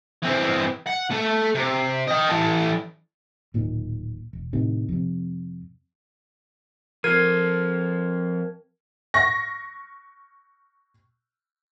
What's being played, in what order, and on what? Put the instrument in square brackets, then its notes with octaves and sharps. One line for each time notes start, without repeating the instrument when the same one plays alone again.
[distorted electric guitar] E3 C4
F#5
A3 A4
C3
D#5 G5
E3 A4
[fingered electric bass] D1 A#2 D#3
E1
A2 C3 D#3
F2 C3
[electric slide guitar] F3 C4 [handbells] A#4 G#6
[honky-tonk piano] C#6 A#6